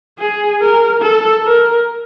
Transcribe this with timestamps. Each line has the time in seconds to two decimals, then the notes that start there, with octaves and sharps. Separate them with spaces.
0.19 G#4
0.61 A#4
1.02 A4
1.45 A#4